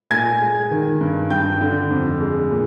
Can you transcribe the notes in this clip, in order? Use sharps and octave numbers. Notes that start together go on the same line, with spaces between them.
A#2 G#5 G#6
G#3
D#3
G2
G2 G5 G6
D3
F2
G#3
A#2